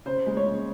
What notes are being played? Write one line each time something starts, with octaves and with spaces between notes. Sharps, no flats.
C#3 C5
G#3
C#5
C#3